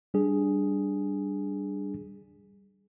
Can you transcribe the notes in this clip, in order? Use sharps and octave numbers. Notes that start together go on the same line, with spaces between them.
G3 D4 G#4